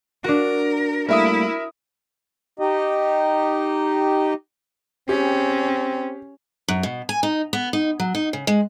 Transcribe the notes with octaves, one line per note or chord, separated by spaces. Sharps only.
D4 F#4 A#4
G3 A3 A#3 E4 A#4 E5 D#6
D#4 G4 D#5
C4 C#4 G4 G#4
F#2
B2
G#5
D#4
B3
D#4
F#3
D#4
C#3
G#3